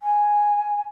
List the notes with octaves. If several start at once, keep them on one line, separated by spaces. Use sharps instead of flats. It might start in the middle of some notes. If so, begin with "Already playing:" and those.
G#5